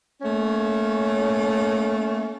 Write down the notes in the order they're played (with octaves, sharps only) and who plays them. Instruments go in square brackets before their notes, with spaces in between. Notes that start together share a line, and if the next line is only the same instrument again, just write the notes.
[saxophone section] A3 A#3 C#4 C#5